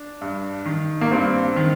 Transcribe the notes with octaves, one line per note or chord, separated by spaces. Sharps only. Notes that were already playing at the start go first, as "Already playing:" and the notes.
Already playing: D4
G2
D#3
A#3
G2 C4
D#3